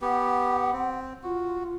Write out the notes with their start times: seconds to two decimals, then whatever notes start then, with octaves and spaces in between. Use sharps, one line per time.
0.02 B3 G4 F#5
0.73 C4
1.23 F4 F#4